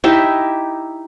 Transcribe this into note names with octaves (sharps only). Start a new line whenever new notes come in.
D#4 E4 G4 E5